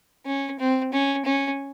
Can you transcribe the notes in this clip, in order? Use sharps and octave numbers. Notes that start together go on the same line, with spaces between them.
C#4
C4
C#4
C#4